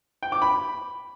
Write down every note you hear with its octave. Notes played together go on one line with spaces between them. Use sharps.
G5
D6
B5